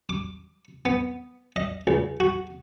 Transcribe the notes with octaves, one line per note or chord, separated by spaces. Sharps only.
D6
B3
D#5
C#2
F#4